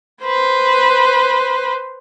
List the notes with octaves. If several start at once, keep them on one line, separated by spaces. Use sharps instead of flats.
B4 C5